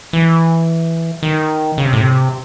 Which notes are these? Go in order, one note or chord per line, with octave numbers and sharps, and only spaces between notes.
E3
D#3
C#3
C3
A2
C3